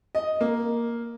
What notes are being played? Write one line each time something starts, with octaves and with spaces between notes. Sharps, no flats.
D#5
A#3